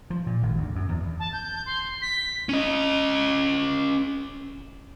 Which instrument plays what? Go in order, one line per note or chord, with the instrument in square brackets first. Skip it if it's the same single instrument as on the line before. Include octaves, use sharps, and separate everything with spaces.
[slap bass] F3
A#2
G#1
D2
F#2
E2
[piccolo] A5
G6
C6
B6
[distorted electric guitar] C#4 D#5